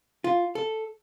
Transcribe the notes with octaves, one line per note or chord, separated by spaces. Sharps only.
F4
A4